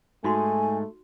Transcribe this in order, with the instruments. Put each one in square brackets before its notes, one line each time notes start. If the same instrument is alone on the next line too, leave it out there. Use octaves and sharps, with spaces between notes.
[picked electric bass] G#2 [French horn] A3 [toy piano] D#4 F#4 C6 [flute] G#5